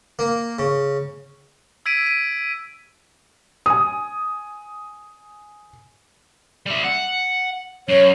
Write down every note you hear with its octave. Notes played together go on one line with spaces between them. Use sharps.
A#3
C#3
E6 G#6 B6 D7 D#7
D#7
G#5 D#6
G3 E5
F#5
F#2 C#5